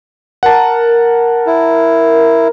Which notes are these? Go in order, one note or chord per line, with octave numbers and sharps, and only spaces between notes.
A#4 F#5 A5
E4